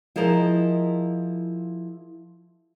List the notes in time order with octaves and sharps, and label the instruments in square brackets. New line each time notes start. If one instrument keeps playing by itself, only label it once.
[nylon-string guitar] F3 E4 G#4 A#4 D#5